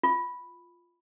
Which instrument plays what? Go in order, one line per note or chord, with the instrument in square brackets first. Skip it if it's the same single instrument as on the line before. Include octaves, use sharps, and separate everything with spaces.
[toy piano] F4